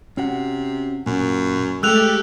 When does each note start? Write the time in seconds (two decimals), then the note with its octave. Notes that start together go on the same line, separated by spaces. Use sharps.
0.17 C3 C#4 F#4 F#5
1.06 F#2 A#2
1.83 G#3 A3 G4 A4 E6 F#6 F7